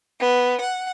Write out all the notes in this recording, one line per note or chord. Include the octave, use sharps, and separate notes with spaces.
B3
F#5